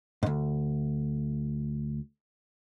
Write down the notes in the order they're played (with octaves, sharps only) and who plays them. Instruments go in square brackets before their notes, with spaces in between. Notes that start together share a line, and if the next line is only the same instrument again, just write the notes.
[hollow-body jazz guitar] D2 G#2